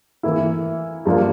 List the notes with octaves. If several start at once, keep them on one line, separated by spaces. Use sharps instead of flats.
E3 A#3 E4
G2 F3 A#3 D4 F4